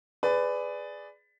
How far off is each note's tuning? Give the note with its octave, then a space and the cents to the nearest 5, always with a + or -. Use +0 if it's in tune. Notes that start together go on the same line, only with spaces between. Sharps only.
G#4 +5 B4 +20 D5 +0